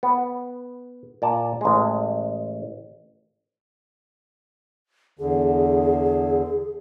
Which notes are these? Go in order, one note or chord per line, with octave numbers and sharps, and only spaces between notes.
B3
A#2 D5 A5
A1 G#3
E2 D3 G#4